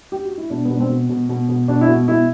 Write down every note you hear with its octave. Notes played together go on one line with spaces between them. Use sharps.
G4
F#4
E4
B2 D4
B2 B3
D4
C4
B2
B2
B2
B2
B2 D4
E4
B2 F#4
B2 E4